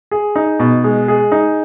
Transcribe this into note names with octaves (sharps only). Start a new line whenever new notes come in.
G#4
D#4
B2
G#3
G#4
D#4